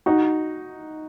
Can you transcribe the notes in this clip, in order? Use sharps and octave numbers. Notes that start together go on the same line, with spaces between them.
D#4 F#4